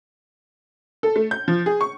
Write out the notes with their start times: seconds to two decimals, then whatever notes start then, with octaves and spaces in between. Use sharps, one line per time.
1.03 A4
1.16 A3
1.31 G6
1.48 F3
1.66 G#4
1.81 C#6